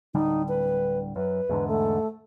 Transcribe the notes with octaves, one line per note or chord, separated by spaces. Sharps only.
D1 D3 G3 D#4
B4
F#2 B4
E2 G#2 D3
A3